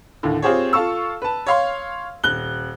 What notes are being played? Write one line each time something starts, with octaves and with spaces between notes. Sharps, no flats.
D#2 A2 D3
C4 F4 G4 G#4 C5 C#5
F4 A4 F5 A5 C#6 E6
B4 A5
C#5 F5 C6
D#1 F#6 G7